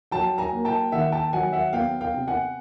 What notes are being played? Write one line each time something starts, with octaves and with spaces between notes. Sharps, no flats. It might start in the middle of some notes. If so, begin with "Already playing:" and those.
F#3 G5 A5
G#5 A#5
A#3
G5 A5
D#3 E5 F#5
G5 A5
F#3 F#5 G#5
E5 F#5
B3 F5 G5
F5 G5
C3
F#5 G#5